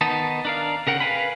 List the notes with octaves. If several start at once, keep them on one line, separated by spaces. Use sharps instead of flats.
D#3 B3 D#4 A5
D4 A#4 F5
C#3 A#4 F#5 G5
B4 F5 G#5 B5